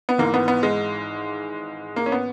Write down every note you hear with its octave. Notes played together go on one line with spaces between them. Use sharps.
B3
G#1 G#2 E3 A#3
B3
B3
G#3
A#3
C#4
B3